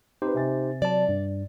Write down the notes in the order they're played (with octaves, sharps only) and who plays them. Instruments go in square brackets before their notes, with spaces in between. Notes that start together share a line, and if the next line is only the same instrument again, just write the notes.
[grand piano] C4 B4 [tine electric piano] D#4 G4 C5
[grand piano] C3 G#5 A6
[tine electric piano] F#3 A5 [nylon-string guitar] D5
[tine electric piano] G2